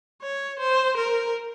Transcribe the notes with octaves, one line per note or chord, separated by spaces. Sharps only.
C#5
C5
A#4